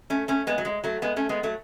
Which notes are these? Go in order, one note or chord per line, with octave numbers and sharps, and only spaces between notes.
A3 C#4
A3 C#4
G#3 B3
F#3
G#3
F#3 A3
G#3 B3
A3 C#4
G#3 B3
F#3 A3